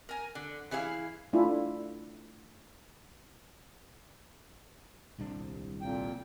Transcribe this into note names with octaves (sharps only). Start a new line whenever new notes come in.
A#4 G#5
D3
E3 E4 G#4 C#5 F5
A3 D4 E4 F4
D#1 C2 D4
F2 A#2 G5